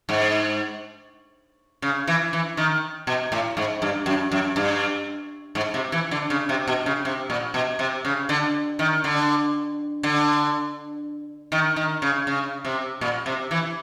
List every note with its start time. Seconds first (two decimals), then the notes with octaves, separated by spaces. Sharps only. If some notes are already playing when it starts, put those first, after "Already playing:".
0.09 G#2
1.82 C#3
2.07 E3
2.33 E3
2.57 D#3
3.07 B2
3.32 A2
3.57 G#2
3.82 G2
4.06 F#2
4.32 F#2
4.56 G2
5.55 G#2
5.74 C3
5.92 E3
6.11 D3
6.30 C#3
6.49 C3
6.68 B2
6.86 C#3
7.05 C3
7.30 A#2
7.54 B2
7.79 C3
8.05 C#3
8.29 D3
8.79 D#3
9.04 D3
10.03 D3
11.52 D#3
11.76 D#3
12.02 C#3
12.27 C#3
12.65 C3
13.01 A#2
13.26 C3
13.51 E3